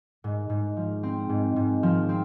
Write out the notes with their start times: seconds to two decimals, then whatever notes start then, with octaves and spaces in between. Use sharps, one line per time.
0.24 G#2
0.50 G#2
0.77 F3
1.03 C4
1.29 G#2
1.56 G#2
1.83 F3
2.09 C4